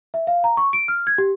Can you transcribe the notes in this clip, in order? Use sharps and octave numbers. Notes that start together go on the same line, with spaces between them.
E5
F5
A#5
C#6
D7
F6
G#6
G4